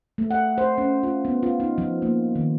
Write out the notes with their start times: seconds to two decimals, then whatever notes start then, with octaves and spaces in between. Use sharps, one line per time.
0.18 A3
0.31 F#5
0.58 C5
0.78 C#4
1.03 F4
1.25 B3
1.43 F4
1.60 D#4
1.78 F3
2.02 A#3
2.35 D#3